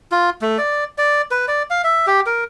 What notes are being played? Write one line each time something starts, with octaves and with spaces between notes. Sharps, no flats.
F4
A3
D5
D5
B4
D5
F5
E5
G4
A#4